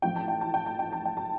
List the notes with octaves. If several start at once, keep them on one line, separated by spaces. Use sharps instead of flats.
A1 A2 F3 C4 G5
A5
G5
A5
G5
A5
G5
A5
G5
A5